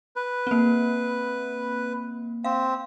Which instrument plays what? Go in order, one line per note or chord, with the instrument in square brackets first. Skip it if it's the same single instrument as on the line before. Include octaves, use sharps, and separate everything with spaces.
[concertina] B4
[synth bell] A#3 C4
[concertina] C4 [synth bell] F5